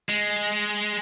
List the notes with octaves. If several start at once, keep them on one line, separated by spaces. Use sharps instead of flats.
G#3